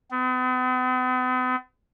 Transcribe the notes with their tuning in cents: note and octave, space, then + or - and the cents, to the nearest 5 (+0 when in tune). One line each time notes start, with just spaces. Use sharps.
B3 +45